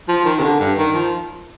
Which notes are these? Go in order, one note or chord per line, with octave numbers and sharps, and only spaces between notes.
F3
D#3
C3
D3
G2
D#3
F3